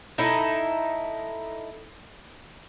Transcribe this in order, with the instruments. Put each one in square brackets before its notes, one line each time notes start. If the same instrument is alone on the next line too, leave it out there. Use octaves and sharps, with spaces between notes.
[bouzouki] D#4 E4 A4